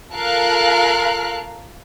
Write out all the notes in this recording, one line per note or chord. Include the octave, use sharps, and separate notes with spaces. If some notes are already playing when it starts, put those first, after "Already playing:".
F4 A4 A#4 F5 F6 F#6